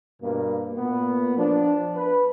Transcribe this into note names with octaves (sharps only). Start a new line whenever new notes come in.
G2 B2 A#3
A#2 A#3 B3
F3 D4
B4